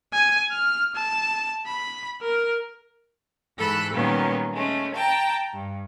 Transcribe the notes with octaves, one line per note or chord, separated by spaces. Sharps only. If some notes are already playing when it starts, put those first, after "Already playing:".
G#5
F6
A5
B5
A#4
G#2 E3 A4 B5 E6 F#6
A#2 D#3 F#3 G3 B3 C#4
G#3 A3 C#4
G5 A5 A#5
G2